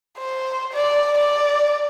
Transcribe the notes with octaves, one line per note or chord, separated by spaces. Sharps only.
C5
D5
D5